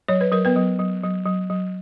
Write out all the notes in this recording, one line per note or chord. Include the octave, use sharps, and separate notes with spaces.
F#3 C#5
B4
F#3 A#4
B3 B4
F#3
F#3
F#3
F#3
F#3